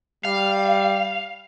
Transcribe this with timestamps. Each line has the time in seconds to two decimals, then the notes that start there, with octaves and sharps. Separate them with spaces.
0.25 G3 F5